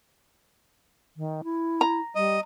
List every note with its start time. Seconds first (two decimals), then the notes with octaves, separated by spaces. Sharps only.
1.17 D#3
1.44 E4
1.81 A#5
2.15 G3 D#5